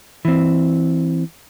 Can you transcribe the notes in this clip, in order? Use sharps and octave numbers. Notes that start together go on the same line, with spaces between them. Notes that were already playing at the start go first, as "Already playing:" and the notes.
E3 C4